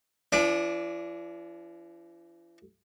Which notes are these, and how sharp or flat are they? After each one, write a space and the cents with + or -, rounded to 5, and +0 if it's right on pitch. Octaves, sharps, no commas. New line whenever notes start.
E3 +45 D4 -20 D6 +30